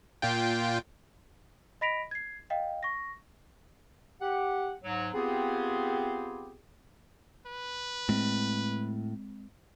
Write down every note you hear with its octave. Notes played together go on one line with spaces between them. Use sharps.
A#2 F4 G5
D#5 B5 A#6 B6 D7 F7
G#6 C7
D#5 F5 G5
C#6 A#6
G4 F#5
G#2 F#3
B3 C4 F4 G4 G#4
B4
A2 G#3 C4